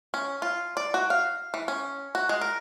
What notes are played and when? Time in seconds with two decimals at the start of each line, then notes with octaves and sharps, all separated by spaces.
0.14 C#4
0.42 F4
0.77 D5
0.94 F#4
1.10 F5
1.54 E3
1.68 C#4
2.15 F#4
2.29 G#3
2.41 A#4